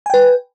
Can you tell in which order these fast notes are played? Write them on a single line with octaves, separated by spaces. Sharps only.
G#5 G5 B4